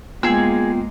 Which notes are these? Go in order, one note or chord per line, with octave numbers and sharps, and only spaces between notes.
G#3 A#3 B3 F4 G#4 G5 E6